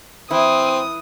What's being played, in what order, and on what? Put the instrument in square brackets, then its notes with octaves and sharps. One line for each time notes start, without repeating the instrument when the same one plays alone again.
[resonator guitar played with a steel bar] E3 E4 [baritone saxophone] C4 [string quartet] D#6